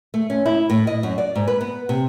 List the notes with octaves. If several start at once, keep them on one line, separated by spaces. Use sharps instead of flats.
A3
C#4
E4
A2
D#5
F#2
D5
G#2
B4
B3
C3